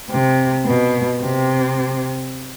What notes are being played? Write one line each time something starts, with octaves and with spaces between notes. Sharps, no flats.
C3
B2
C3